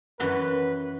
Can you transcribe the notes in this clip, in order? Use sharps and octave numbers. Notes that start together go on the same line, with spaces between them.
F#2 E3 F#4 B4